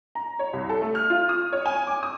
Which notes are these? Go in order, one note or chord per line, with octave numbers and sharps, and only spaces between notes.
A#5
C#5
C2
A4
A3
F6
F4
D#6
C#5
G#5
D6
D#6